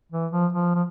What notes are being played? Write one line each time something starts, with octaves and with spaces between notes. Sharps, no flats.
E3
F3
F3
F3